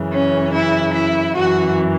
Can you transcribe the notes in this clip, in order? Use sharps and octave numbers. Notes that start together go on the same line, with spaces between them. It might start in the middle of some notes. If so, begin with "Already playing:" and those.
Already playing: F#2 C#3 E3
C#4
E4
E4
F#2 E3 F#4